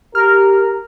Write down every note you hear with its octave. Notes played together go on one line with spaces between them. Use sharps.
G4 A#4 F6